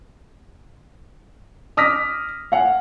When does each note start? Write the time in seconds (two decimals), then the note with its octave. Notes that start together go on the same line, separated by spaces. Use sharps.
1.77 D6 D#6 F6 A#6 B6
2.52 F5 F#5 G#5